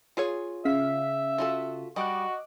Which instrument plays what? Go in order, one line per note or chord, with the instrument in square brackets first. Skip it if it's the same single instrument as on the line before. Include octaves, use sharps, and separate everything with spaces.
[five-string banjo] F4 G#4 C#5
[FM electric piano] C#3 F5 B6 [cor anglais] E5
[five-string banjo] F4 F#4 A4
[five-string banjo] G3 [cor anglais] F#4 [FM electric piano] D#5 D6 F#6